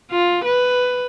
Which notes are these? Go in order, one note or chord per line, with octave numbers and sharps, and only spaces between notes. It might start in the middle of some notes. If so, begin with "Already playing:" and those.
F4
B4